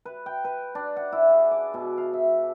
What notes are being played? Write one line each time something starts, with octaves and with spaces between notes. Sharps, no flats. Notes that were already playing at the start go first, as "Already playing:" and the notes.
B4
G5
B4
D4
F#5
E4
G#4
D6
B2
F5
E5